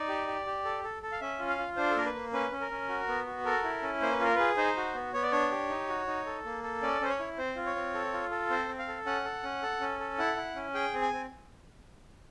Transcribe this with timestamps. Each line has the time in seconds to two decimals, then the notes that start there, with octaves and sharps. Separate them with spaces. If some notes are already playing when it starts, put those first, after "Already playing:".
Already playing: D#4 D5
0.09 G4
0.27 G4
0.46 G4
0.65 A4
0.84 A4
1.03 A4
1.12 F5
1.21 C#4 E5
1.39 F4
1.50 F5
1.58 F4
1.76 D4 C5
1.91 A4
1.96 A#3 A#4
2.06 B4
2.15 A#3
2.33 C#4 B4
2.52 C#4
2.61 A#4
2.71 C#4
2.89 F#4
3.08 B3
3.26 F#4
3.45 A4 A#4
3.64 E4
3.82 C#4
4.02 A#3 C5
4.12 B4
4.19 F4 A#4
4.36 G#4 B4
4.57 D#4 C5
4.77 F#4
4.94 B3
5.13 B3 C#5
5.23 D5
5.32 D4 C#5
5.52 G4
5.70 D#4
5.89 F#4
6.07 D#4
6.26 A4
6.45 A#3
6.63 A4
6.82 C#4 D5
7.01 C#4 C5
7.09 C#5
7.19 E4
7.38 C4 C5
7.56 F4
7.66 C#5
7.76 C4
7.94 A4
8.13 F4
8.31 A4
8.50 C4 C5
8.69 C4
8.79 F5
8.88 A4
9.06 C#4 F#5
9.25 A4
9.43 C#4
9.63 A4
9.81 C#4
10.00 A4
10.18 E4 F#5
10.37 E4
10.55 C#4
10.74 G#4 G5
10.94 C4
11.02 G#5
11.12 C4